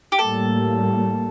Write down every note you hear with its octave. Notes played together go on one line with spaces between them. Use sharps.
G4
A2 G3 A#3 A4